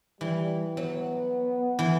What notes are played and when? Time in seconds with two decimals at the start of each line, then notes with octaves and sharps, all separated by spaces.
0.21 E3 G3
0.77 F#3 B3
1.79 E3